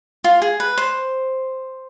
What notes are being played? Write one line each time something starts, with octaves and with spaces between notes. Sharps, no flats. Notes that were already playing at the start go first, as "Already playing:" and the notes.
F4
G#4
B4
C5